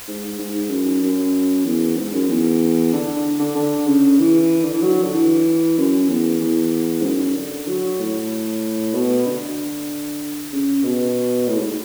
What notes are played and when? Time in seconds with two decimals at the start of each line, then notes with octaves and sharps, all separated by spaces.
0.07 G#2
0.38 G#2
0.70 F#2
1.02 F#2
1.65 E2
1.97 G#2
2.13 F#2
2.29 E2
2.93 D3
3.39 D3
3.56 D3
3.87 C#3
4.19 E3
4.64 D3
4.73 E3
4.82 F#3
5.03 D3
5.14 E3
5.78 F#2
6.09 E2
6.41 E2
7.00 G#2
7.04 F#2
7.35 D3
7.67 F#3
7.99 A2
8.93 B2
9.26 D3
10.52 C#3
10.83 B2
11.47 A2
11.57 G#2